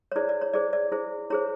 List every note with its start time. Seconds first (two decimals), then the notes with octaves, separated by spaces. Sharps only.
0.12 C#5
0.16 E4 G#4 C5 D5
0.29 D5
0.41 C#5
0.54 E4 G#4 C5 D5
0.73 D5
0.92 E4 G#4 C5
1.30 E4 G#4 C5 C#5